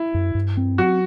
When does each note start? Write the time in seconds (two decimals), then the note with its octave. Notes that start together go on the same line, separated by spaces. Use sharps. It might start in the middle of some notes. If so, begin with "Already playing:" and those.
Already playing: E4
0.14 F#2
0.35 G2
0.57 C4
0.78 F#3 F#4